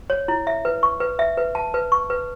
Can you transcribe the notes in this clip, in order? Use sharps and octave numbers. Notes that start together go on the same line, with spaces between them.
C#5
E4
E5
B4
C#6
B4
E5
B4
A5
B4
C#6
B4